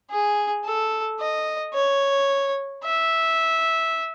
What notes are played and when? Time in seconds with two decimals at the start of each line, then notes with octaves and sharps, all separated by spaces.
0.11 G#4
0.64 A4
1.20 D#5
1.74 C#5
2.84 E5